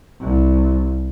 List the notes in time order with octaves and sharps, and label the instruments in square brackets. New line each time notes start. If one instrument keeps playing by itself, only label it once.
[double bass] C2